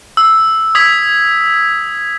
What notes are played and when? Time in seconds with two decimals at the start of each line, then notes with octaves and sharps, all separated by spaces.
0.17 E6
0.75 D#6 E6 G#6 B6